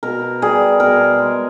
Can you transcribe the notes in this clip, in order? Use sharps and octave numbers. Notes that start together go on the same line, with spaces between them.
B2 A#4
G3 G#4
B2 A#4
G#3